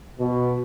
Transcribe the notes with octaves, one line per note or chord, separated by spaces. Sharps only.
B2